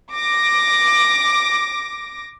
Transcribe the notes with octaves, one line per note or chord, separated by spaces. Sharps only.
D6 A#6